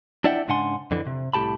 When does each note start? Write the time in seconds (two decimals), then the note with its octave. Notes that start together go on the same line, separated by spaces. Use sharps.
0.24 D4 E4 D5 E5 F#5 G5
0.48 G#2 C#3 D4 F#5 G#5 C6
0.91 F2 D3 E3
1.07 C3
1.33 C2 A2 G4 A5 B5